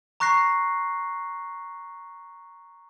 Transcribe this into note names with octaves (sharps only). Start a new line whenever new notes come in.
A#5 C#6 F#6 A#6 C7